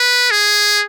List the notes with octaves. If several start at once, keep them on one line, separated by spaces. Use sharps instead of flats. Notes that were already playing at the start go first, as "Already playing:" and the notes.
Already playing: B4
G#4